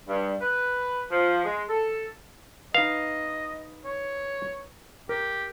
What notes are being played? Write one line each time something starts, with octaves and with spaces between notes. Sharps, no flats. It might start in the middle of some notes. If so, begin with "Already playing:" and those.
G2
B4
F3
G#3
A4
D#4 B4 D#5 F5
C#5
G4 A#4